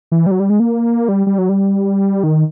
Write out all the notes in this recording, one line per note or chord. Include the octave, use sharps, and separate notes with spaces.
E3
G3
F#3
G3
G#3
A#3
G3
G3
F#3
G3
D#3